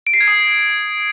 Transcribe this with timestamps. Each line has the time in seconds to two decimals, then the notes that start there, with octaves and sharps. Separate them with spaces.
0.07 D7
0.14 C7
0.21 G#6
0.28 D#6